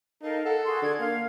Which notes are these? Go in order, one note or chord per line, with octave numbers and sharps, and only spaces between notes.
D#4 A4 A#4 F5
A4 F#5
F#4 G#4 C6
D3 G#6
A#3 F5